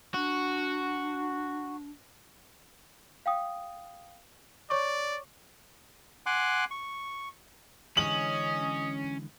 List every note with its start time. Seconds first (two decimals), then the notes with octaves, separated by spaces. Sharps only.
0.14 D4 F#4
3.26 F5 G5 D#6
4.70 C#5 D5 C#6 D6
6.26 F#5 G#5 C6 D6 F#6
6.71 C#6
7.97 D3 E3 G#3 C#4 D#5 F#7